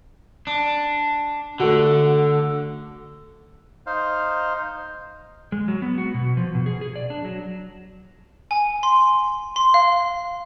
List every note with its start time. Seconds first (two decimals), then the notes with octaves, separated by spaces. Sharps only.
0.47 D4
1.60 D3 A3 F#4
3.86 D#4 C5 F5
5.52 G#3
5.68 F#3
5.82 B3
5.98 F#4
6.14 B2
6.37 F3
6.55 B2
6.66 G#4
6.81 G#4
6.96 D5
7.10 D4
7.25 F#3
8.51 G#5
8.83 C6
9.56 C6
9.74 F5